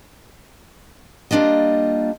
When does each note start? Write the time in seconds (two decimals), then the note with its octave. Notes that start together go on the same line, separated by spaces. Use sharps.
1.31 G3 A#3 D4 F4 D#5